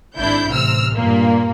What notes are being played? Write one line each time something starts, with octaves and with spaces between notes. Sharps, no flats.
G#1 D4 E4 G6
A1 C3 E6 F6
G2 A#2 A#3